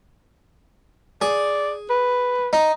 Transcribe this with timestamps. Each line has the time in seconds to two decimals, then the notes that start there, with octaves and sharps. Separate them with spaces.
1.22 G#4 D5
1.90 B4
2.53 D#4